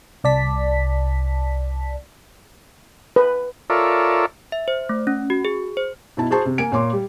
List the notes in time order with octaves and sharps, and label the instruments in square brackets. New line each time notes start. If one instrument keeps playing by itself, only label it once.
[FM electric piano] C2 D5 A5 B6
[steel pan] B4
[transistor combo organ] F4 A4 A#4 C#5 D5 E5
[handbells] E5
C5
A3
C#4
F#4
G#4
C5
[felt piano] B2 E4 A5
F#4 G#4 C5 A5 C6 C#6
C3
A#3 G#5 D7
A#2 C#5 C6 D6
G3